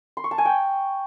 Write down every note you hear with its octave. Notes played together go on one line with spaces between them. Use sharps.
C6
C#6
A5
G#5
G5